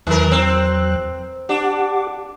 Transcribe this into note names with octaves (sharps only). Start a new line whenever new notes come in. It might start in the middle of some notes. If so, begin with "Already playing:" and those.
E2 D#3 F#3 A#4 F#6
C4
D4 G4 F#5 D6